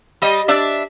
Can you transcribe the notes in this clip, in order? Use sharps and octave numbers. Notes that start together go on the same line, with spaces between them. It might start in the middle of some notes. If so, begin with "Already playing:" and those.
G3 D#5
D4 D5 E5